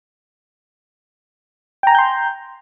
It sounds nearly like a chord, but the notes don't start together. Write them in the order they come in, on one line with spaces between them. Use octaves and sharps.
G5 A#5 G#5 G6 C6